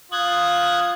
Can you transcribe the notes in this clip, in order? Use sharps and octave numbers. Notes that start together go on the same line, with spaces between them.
F4 D#6 F#6 G#6